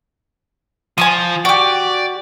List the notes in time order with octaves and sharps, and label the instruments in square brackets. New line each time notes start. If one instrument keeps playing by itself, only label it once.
[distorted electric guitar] F3 [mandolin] G#5 C6 D#6
[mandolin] F#4 G4 [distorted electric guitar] D5